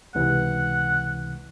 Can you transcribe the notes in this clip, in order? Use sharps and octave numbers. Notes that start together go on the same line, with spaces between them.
C#2 C3 E3 F#5